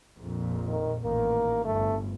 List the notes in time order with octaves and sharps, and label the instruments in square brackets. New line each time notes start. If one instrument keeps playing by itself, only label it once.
[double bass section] A#1 F2 A#2
[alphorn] D#3
[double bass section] A1 D#3 [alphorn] A#3
[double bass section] G1 D2 [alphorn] A3